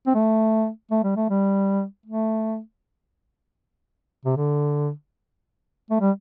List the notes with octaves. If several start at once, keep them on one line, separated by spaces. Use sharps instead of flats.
C4
A3
A3
G3
A3
G3
A3
C3
D3
A3
G3